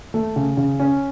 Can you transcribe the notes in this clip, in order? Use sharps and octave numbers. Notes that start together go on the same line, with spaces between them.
A3
C#3
C#3
C#4